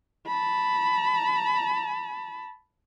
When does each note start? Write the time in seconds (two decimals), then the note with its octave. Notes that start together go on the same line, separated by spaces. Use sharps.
0.26 A5 B5